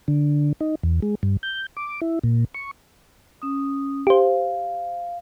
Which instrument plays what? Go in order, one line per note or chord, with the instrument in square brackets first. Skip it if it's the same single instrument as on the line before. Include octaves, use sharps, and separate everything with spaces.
[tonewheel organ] D3
D#4
E2
G#3
G2
G6
D6
E4
A#2
C#6
[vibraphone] C#4 D#6
[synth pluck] G4 C5 [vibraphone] F5